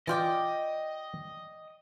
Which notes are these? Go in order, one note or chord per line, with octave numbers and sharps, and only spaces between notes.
E3 F4 D5 D#5 G5 D6